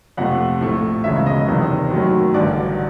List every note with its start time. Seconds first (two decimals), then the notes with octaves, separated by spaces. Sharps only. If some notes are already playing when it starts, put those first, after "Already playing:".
0.17 F2 C3 F3 A3 F#5
0.61 A#1 A2 F3 A3
1.04 E1 D2 C#3 F3 G#3 E5
1.26 D#5
1.47 F#1 E2 C3 D#3
1.90 F#2 D#3 F#3 A3
2.34 A1 G2 D3 F#3 D5